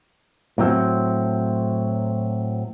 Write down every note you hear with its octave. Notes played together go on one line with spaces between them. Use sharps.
A2 F#3 C4